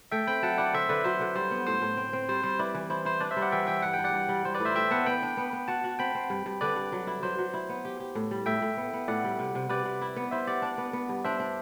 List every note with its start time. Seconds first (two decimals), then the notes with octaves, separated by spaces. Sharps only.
0.12 A3 E5 G5
0.27 C4 G5 B5
0.42 F#3 F#5 A5
0.58 E4 D5 F#5
0.73 D3 C5 E5
0.89 D3 B4 D5
1.04 F#3 C5
1.21 D3
1.35 G3 C5
1.51 B3
1.67 A2 C5
1.82 A2
1.97 C4
2.13 C4
2.28 G3 C5
2.44 G3 C5
2.59 E4 B4 D5
2.75 E3
2.90 E4 C5
3.05 E4 C5
3.21 D4 B4 D5
3.31 C5 E5
3.37 G3
3.42 D5 F#5
3.52 E3 E5 G5
3.67 E3 E5 G5
3.82 G2 F#5
3.94 G5
3.99 G2
4.04 D5 F#5
4.14 G2
4.29 G3
4.45 G3 C5
4.55 B4 D5
4.60 A2
4.65 C5 E5
4.76 A2 E5 G5
4.91 B3 F#5 A5
5.06 B3 G5 B5
5.22 D4
5.37 B3
5.53 B3
5.68 F#4 F#5 A5
5.84 F#4
5.99 C4 G5 B5
6.15 C4
6.30 G2
6.46 G2
6.61 D3 B4 D5
6.76 G2
6.92 F#3
7.07 E4
7.23 F#3 C5
7.38 F#3
7.54 E4
7.69 B3
7.85 G4
8.00 G4
8.15 A2
8.31 G3
8.46 A2 E5 G5
8.62 A2
8.77 B3
8.93 B3
9.08 A2 D5 F#5
9.24 G3
9.39 C3
9.55 C3
9.69 C3 B4 D5
9.85 C3
10.02 E4
10.16 B3
10.31 E4 C5 E5
10.47 G4 D5 F#5
10.62 D4
10.78 B3
10.93 B3
11.09 G2
11.25 D4 C5 E5
11.40 D4